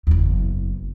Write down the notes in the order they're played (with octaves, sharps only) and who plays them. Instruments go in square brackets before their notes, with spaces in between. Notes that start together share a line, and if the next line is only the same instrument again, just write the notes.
[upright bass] F#1 E2